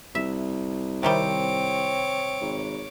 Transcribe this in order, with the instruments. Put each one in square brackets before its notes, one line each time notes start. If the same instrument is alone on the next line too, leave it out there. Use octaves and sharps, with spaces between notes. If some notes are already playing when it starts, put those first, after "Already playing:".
[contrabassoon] C2 [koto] E5
[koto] C3 D#3 G3 [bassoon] C4 [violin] C#5 D6
[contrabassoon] G#1